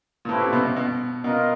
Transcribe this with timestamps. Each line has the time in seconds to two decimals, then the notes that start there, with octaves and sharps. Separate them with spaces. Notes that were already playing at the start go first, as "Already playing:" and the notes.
0.25 A#2
0.29 A2 A3 C4 E4 G4 B4
0.41 A#2
0.53 B2
0.65 B2
0.76 B2
1.24 B2 F4 A#4 D#5